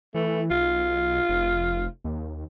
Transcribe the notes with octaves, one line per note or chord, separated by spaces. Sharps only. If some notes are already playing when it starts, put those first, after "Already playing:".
E3 A3
B1 F4
F1
D#2